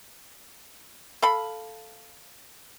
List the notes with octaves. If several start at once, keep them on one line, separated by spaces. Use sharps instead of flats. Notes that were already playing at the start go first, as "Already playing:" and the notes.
A4 F5 B5